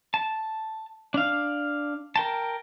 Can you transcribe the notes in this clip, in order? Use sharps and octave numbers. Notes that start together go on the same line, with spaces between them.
A5
D4 F5
A#4 G5 A5